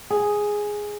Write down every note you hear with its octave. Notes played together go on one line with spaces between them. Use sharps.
G#4